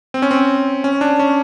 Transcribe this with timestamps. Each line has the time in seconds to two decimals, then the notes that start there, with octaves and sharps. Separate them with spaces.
0.14 C4
0.22 C#4
0.31 C4
0.84 C#4
1.01 D4
1.19 C#4